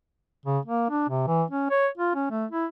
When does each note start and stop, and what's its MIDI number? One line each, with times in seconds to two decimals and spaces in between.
0.46 0.59 49
0.65 0.89 58
0.90 1.05 62
1.09 1.25 48
1.27 1.44 52
1.50 1.68 61
1.70 1.88 73
1.98 2.14 65
2.15 2.27 61
2.30 2.46 57
2.51 2.66 64